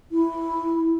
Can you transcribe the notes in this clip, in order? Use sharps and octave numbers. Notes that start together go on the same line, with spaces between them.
E4